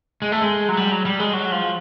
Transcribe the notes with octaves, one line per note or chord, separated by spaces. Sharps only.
G#3
A3
G#3
F#3
G3
F#3
G3
G#3
F#3
F3